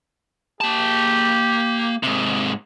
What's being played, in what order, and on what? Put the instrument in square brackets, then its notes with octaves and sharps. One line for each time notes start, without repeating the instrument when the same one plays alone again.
[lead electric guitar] A#3 A5 [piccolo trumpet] G4
[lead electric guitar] G#2 C3